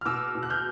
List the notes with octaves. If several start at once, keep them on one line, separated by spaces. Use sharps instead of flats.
F6
B2 D6 E6
B2
F#6
F6 G6